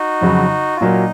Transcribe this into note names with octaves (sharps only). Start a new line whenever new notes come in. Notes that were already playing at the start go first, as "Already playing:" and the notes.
Already playing: D#4 F#4
F2 C#3 F#3
F4
A#2 F#3 A#3 D#4